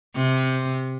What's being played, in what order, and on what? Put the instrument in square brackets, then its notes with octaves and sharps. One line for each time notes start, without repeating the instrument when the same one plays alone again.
[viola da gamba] C3